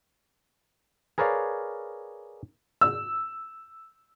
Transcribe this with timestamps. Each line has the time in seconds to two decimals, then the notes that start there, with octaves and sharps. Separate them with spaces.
1.18 G#4 A#4 B4 C#5 D5 F5
2.81 E6